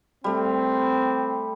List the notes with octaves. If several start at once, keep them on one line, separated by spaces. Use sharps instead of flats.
G3 A3 C4